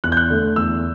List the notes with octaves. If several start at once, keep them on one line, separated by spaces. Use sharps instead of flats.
E2 F#6
G6
F#6
D3 A3
E2 E6